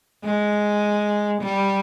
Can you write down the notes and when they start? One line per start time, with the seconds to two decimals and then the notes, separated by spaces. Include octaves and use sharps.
0.24 G#3
1.41 G3